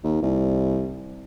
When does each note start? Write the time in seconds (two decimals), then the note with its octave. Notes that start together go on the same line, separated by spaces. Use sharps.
0.04 D#2
0.22 C2